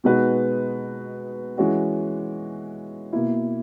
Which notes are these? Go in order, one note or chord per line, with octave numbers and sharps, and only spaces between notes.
B2 G#3 D#4 F#4 B4
E3 G#3 C#4 F#4
B2 A#3 E4